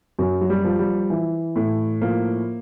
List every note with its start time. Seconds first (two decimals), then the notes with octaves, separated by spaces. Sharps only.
0.19 F#2 F#3
0.41 F#3
0.50 G3
0.64 F3
0.79 G3
1.10 E3
1.56 A2
2.01 F3 A#3